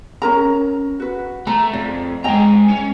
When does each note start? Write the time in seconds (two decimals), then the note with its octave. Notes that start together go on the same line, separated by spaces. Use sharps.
0.22 C#4 A#4 A#5
1.00 F#4 B4
1.47 A3 A#5
1.73 F2 D5
2.24 G#3 D#5 G5 G#5 A#5
2.70 C#4